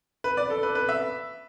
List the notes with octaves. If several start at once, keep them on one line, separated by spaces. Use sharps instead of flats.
B4
D5
A4
B4
B4
E5